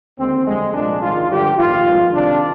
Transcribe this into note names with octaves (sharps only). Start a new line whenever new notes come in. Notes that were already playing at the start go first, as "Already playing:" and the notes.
D#2 D3 G#3 C4
F2 D3 G3 G#3
C2 A#2 F3 G#3 D4
G#1 G#2 D#3 G#3 F4
G2 D3 F3 G4
A#1 G#2 D#3 F4
G#1 G2 F3 G#3
C2 C3 D#3 D4